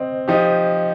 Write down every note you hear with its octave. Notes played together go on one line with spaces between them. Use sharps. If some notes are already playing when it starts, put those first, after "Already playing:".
Already playing: C4 C5 D#5
F3 D#4 G4